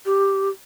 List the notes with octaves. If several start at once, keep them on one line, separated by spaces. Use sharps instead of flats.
G4